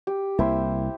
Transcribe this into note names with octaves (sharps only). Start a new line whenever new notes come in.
G4
C2 A#3 E4 G4 C5